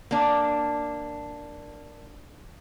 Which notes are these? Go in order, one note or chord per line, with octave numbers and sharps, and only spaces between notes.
A#3 D4